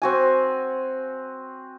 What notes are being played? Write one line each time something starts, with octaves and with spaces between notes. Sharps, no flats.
C4 F#4 G#5